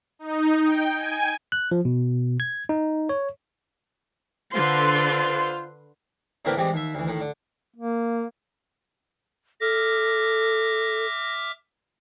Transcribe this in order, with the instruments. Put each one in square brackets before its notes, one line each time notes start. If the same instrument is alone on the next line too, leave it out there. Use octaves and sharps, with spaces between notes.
[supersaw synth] D#4
G5
G#5
[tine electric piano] F#6
F3
B2
G#6
D#4
C#5
[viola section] D3 B4 C6 [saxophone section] F4 C5
[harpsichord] A2 D3 A#3 C4 A#4 B4
E3 G3 G#3 C4 G4 D#5
D#2 E5
D2 E3
A2 D#3
D3
[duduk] A#3
[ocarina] A4 [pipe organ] E5 D6 F6 [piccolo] A#6